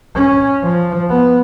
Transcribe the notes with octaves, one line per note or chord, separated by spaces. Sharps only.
C#4
F3
B3